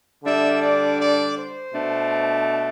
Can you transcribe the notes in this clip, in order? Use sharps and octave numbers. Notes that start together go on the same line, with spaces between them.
D3 G3 D4 E5
D5
D5
C5
B2 A3 D4